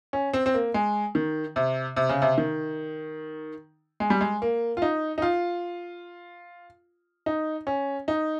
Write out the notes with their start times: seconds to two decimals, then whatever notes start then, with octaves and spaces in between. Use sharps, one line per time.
0.13 C#4
0.34 C4
0.46 C4
0.54 A#3
0.74 G#3
1.15 D#3
1.56 C3
1.96 C3
2.09 C#3
2.22 C3
2.38 D#3
4.00 G#3
4.10 G3
4.21 G#3
4.42 A#3
4.77 F4
4.82 D#4
5.18 D#4
5.22 F4
7.26 D#4
7.67 C#4
8.08 D#4